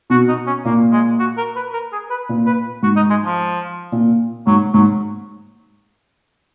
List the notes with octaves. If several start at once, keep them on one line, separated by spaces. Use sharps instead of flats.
B2 F#4
D#4
C#4
A#2 A#3
G#3
F#4
A#4
B4
A#4
G#4
B4
A#2
B4
G#2 F#4
D#4
G#3
F3
A#2
G#2 F#3
G#2 F#3